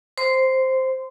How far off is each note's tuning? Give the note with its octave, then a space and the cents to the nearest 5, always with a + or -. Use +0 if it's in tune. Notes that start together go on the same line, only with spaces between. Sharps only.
C5 +0 C6 -20